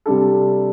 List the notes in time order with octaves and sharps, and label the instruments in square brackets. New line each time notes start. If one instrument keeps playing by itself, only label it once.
[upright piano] C3 G3 D4 A4